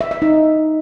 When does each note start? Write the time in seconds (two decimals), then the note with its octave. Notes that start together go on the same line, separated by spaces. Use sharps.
0.01 E5
0.11 E5
0.22 D#4